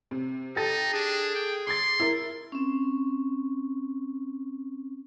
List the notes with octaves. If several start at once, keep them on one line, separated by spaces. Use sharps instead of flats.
C3
D#4 G4 A4 A6
D4 G#4
G5
C6 D6 G#6 A6
E4 A#4
C4 C#4